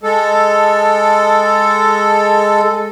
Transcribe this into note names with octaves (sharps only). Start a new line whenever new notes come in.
G#3 A4